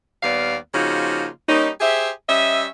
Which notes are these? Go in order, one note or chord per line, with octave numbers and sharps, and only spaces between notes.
D#2 G3 A#3 B3 D5 F5
C#3 F3 A#3 D#4 F4 F#4
G3 A#3 C#4 D#4
G4 G#4 C5 E5
G3 C#4 D#5 E5